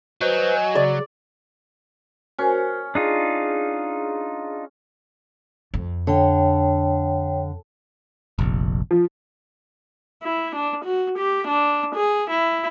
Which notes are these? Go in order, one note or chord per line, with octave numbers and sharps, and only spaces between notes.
F#3 B4 C5 D#5 G#5
C#3 D5
C#4 F#4 A#4 C5
D4 D#4 F4 G#4
F2
D3 C#5 G5
F1 A#1
F3
E4
D4
F#4
G4
D4
G#4
E4